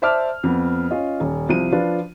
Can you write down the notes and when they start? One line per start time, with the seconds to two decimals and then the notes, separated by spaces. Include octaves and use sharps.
0.02 C5 D5 E5 A5 D6 F6
0.43 F2 B3
0.91 C#4 F4 D#5
1.20 D#1
1.49 C2 F3 D#7
1.72 F3 D4 F4 B4